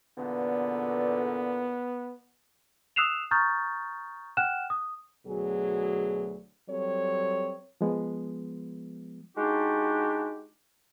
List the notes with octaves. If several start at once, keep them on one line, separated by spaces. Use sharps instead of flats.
E2 A#2 D3 B3
D#6 E6 F#6 C7 E7 F7
A#5 C#6 D#6 F6 G6 A6
F#5 G5 F6 F#6 E7
D#6
D2 B2 F#3 G#4
F#3 G3 C4 A4 C#5
F3 G#3 B3
G#3 D4 D#4 F#4 G4